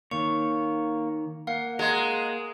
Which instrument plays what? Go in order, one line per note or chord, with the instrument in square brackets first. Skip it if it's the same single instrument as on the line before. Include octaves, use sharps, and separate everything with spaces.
[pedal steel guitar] D#3 C#5 [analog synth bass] A#3 [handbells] C#6
[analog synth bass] A#3 [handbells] F5 F#5
[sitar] G#3 [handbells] F#5 C6 [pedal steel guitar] A#5